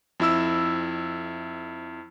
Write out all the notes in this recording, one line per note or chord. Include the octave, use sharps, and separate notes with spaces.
F2 E4 E6